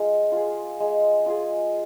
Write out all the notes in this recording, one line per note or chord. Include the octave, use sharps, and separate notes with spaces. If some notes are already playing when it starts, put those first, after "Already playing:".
Already playing: G#3 F4 G#4
F4 G#4
G#3
F4 G#4